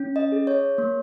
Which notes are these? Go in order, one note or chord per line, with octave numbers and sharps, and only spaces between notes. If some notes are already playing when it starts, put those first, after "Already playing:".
Already playing: C#4
D#5
G#4
C#5
A#3